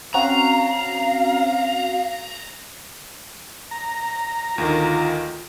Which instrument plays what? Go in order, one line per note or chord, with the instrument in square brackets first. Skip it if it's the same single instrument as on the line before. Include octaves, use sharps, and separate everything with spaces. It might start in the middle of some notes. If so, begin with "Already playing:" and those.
[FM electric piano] C4 C#4 F#4 [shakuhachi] F5 [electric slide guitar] A#5
[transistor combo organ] A#5
[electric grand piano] D2 D#3 [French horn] F4